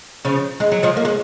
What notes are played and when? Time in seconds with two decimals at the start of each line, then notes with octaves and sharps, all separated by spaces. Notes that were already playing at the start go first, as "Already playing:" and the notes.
0.25 C#3 F3
0.60 G#3
0.72 F#3
0.83 F3 G#3
0.97 A#3
1.05 G#3